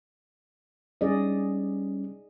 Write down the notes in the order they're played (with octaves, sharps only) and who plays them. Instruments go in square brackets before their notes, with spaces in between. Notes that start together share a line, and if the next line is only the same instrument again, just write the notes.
[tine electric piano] G3 C#4 [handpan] G#4 D5 D#5